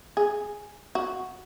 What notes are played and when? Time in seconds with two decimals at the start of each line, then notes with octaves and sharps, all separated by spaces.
0.17 G#4
0.95 F#4